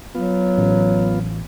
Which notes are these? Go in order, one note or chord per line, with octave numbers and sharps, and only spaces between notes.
F#3 B3 F4
A1